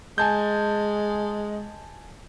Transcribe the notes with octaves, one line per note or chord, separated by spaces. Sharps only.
G#3 G#5 A5 G6